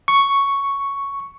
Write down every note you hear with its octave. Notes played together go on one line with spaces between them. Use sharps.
C#6